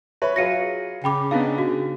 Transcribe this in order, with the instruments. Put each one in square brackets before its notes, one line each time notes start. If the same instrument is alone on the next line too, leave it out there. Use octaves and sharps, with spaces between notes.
[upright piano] B4 C#5 [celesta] E5
[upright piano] F#3 F4 G#4 [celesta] A#6 C#7 D#7
[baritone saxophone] C#3 [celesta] G5 B5 D6
[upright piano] B3 D4 D#4 [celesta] F5
[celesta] F#4